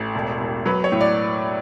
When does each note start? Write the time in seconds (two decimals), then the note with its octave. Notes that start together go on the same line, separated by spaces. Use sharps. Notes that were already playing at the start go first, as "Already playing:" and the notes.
Already playing: A1 A4
0.15 E1
0.41 E1
0.66 F#3 B4
0.84 C#5
0.92 A2
1.01 D5